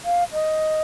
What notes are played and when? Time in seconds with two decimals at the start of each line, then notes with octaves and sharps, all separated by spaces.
0.05 F5
0.33 D#5